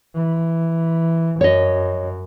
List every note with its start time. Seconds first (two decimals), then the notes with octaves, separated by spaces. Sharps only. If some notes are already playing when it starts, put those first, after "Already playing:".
0.16 E3
1.41 F#2 C#5 D#5